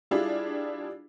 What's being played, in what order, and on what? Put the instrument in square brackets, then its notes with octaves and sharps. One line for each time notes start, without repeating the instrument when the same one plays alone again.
[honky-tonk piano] G3 D4 E4 F4 G#4